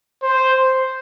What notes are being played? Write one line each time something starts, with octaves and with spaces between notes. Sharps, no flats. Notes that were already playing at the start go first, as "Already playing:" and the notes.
C5